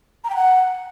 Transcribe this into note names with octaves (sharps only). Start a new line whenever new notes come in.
A#5
G5
F#5